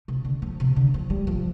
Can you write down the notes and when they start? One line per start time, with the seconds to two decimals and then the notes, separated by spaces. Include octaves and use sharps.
0.08 C3
0.25 D3
0.42 F3
0.60 C3
0.76 D3
0.94 F3
1.10 G3
1.27 F3